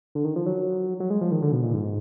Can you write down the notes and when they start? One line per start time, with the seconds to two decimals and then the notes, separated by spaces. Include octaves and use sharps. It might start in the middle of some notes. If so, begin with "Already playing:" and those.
0.15 D3
0.25 D#3
0.36 F3
0.46 F#3
1.00 F#3
1.10 G#3
1.21 F3
1.31 D#3
1.42 D3
1.52 B2
1.63 A#2
1.73 G#2